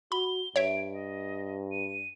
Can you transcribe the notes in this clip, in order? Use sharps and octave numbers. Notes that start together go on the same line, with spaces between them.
F#4 B5 G7
G2 C#5 E5 D7
D#5
D#7